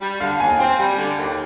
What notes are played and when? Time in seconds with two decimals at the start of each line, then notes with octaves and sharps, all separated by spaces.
0.01 G3
0.20 D3 F5
0.40 D#2 G#5
0.59 C4 G5
0.79 G3
0.98 D3
1.17 D#2